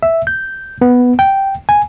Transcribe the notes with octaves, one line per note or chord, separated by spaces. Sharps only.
E5
G6
B3
G5
G#5